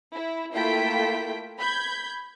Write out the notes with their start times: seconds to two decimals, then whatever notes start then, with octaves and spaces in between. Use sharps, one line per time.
0.13 E4
0.54 A3 A#3 E4 F4 G5 B6
1.58 B5 G6 G#6